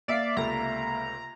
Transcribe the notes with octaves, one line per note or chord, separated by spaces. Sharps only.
A#3 D5 E5 F5
C#2 C3 A3 A#5